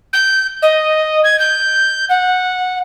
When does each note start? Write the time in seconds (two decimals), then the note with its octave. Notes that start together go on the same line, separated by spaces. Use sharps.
0.13 G6
0.62 D#5
1.24 G#6
1.39 G6
2.09 F#5